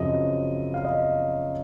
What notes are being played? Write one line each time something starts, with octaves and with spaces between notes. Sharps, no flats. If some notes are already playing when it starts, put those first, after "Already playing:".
Already playing: F#2 C#3 F3 C4 D#5
F5
D#5